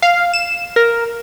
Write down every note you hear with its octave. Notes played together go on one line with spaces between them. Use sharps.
F5
E7
A#4